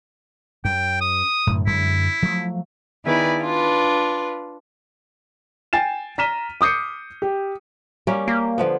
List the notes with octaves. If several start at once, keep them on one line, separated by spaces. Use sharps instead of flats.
F#2 G5
D#6
F#2 A2 D3
F#2 D3 G#3 E4
F3 F#3 A3
D#3 B3 E4 G#4 B4 D5
D4 F4 B4
G5 G#5 A6 C7 E7
A#5 F6 B6 D#7 E7 G7
D6 D#6 G6 C7 C#7
G4
G3 A#3 C#4
A#3 G4
D3 F3 B3